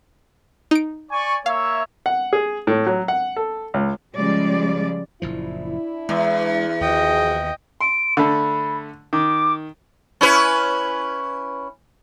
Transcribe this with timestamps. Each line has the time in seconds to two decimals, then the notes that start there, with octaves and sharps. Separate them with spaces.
0.71 D#4 D7
1.11 D5 G#5 C#6
1.46 A#3 C#5 E5 F5
2.06 F#5
2.33 G#4
2.67 A2
2.87 F#3
3.08 F#5
3.36 A4
3.74 C#2
4.15 C#3 F3 G3 G#3 D5
5.22 F#1 A#2 F3 D4 E4
6.09 E2 G#3
6.81 D#2 F3 F#4 G#4 D#5 G5
7.81 C6 D7
8.17 D3 A3 B5
9.13 D#3 D6
10.21 C#4 E4 B4